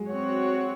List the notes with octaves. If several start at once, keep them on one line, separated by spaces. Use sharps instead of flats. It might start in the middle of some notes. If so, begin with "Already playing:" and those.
Already playing: F#3 G#3
C4 F#4 C#5